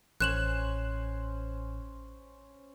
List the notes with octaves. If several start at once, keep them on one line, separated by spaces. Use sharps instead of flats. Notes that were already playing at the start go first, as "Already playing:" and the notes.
A1 C#4 C5 G#5 F#6 E7 F#7